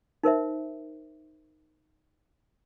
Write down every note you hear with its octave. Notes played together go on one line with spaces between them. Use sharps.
D#4 A#4 C5 E5